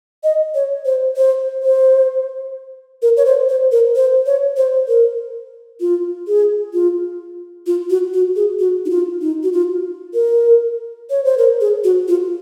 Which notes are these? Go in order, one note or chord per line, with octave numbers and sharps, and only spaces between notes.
D#5
C#5
C5
C5
C5
A#4
C#5
C5
C5
A#4
C5
C#5
C5
A#4
F4
G#4
F4
F4
F#4
F#4
G#4
F#4
D#4
F4
D#4
F#4
F4
A#4
C#5
C5
A#4
G#4
F#4
F4